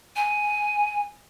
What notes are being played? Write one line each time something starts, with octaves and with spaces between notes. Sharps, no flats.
G#5